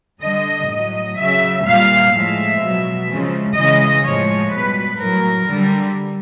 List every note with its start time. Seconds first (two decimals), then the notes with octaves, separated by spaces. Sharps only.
0.23 D3 G3 D#5
0.70 A2 F#3 D#5
1.18 C#3 F#3 E5
1.66 A#2 G3 F5
2.13 A2 F3 G#3 E5
2.61 B2 F#3
3.09 C#3 F3 G#3
3.56 C#3 E3 G#3 D#5
4.04 A2 F3 G#3 C#5
4.51 B2 G3 B4
4.98 A2 F#3 A#4
5.47 D3 G3